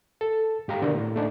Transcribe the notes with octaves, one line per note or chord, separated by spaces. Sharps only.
A4
G#2 G4 F5 A#5
B2 D3 D4 A#4
A2
A3 D4 D#4